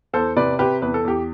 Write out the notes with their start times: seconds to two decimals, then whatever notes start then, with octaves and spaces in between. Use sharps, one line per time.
0.13 E2 A4 C5
0.36 C3 B4 D5
0.59 C3 G4 B4
0.82 E2 B4
0.94 A4
1.05 E2 G4